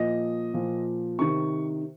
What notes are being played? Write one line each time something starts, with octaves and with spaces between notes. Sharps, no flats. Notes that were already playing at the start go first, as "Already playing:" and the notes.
Already playing: A#2 F3 D#5
A#2 F3
C3 D#3 C#6